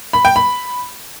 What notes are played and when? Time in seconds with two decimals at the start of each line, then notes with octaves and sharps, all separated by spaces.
0.13 B5
0.25 G5
0.36 B5